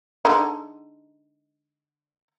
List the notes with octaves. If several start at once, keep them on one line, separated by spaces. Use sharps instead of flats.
D3 G#3 D#4